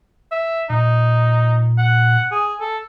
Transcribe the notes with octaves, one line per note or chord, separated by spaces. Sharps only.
E5
A#2 D#4
F#5
G#4
A4